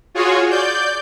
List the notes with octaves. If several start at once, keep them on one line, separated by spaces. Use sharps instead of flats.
F4 F#4 G#4 C#5
D5 G6